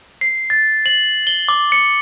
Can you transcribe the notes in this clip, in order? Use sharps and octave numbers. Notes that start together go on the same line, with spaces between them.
C7
A6
F#7
G7
D6
C#7